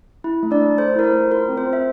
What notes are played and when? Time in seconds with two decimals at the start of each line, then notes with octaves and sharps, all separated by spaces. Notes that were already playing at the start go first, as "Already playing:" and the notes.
0.24 E4
0.43 A3
0.51 D4 D5
0.60 A3
0.78 A4 C5
0.96 E4 A#4
1.04 C5
1.13 A3
1.30 F4 A#4
1.49 C4
1.57 C5
1.66 C4
1.73 E5